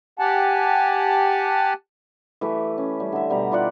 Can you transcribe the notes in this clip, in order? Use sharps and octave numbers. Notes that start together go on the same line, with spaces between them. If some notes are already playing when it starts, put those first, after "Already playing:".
G4 F#5 G#5 A5
E3 A3 G4 B4
C#4
G3
D3 E5
B2 G3 G4 A#5
E4 F4 D5 F#5